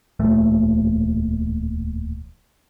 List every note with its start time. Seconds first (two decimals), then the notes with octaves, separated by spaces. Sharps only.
0.19 D1 E2 A#2 A3